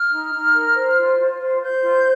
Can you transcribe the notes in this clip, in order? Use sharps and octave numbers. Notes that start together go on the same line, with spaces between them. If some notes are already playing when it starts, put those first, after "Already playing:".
Already playing: F6
D#4
D#4
A#4
C5
F4
F4
C5
C5 G6
F4